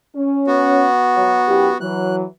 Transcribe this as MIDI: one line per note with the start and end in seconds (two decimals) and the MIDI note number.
0.15 0.86 61
0.47 1.78 59
0.47 1.78 66
1.16 1.41 54
1.48 1.69 42
1.48 1.69 64
1.48 1.69 67
1.80 2.24 52
1.80 2.24 54
1.80 2.16 90